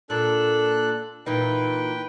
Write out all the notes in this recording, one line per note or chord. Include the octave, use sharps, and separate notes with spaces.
A#2 D4 A4 F#6
A#2 E3 D#4 B4 G5